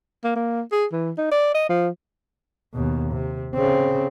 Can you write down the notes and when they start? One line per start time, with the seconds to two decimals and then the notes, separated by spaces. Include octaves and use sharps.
0.24 A#3
0.36 A#3
0.72 G#4
0.92 E3
1.18 D#4
1.31 D5
1.54 D#5
1.69 F3
2.74 D#2 B2
3.13 C3
3.55 C#3 C4